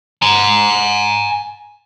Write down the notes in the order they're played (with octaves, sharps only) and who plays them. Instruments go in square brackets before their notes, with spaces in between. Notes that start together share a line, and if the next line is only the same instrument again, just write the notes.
[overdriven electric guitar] G#5 A#5